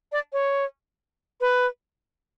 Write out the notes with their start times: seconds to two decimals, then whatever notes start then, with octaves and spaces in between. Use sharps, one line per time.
0.12 D5
0.33 C#5
1.41 B4